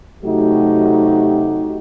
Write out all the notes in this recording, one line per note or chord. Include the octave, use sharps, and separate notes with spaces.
C3 F#3 A3 D#4 F#4 G4